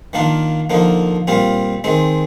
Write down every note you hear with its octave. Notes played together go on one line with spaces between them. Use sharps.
D#3 A#3 D4 F4
D3 F3 A#3 D#4
A#2 G3 C4 F4
D#3 G#3 C4